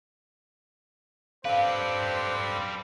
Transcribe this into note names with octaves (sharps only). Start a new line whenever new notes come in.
C4 G4 A4 B4 C5 D5 F5